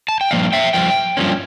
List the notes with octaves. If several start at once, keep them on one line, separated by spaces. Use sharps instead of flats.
A5
G5
G2 F3 A#3 F5
E5 G5
G2 F3 G5
G2 F3 A#3 C#4